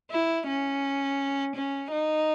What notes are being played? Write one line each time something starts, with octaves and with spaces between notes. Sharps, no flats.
E4
C#4
C#4
D#4